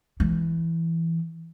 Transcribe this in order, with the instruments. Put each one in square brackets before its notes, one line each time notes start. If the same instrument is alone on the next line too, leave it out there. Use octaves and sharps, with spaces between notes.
[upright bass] E3